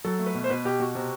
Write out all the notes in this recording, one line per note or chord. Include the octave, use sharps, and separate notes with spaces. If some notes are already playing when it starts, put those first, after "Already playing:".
F#3 A4
A3
B4
B2
C5
B2 B4
B2 G4
B2 F#4
C3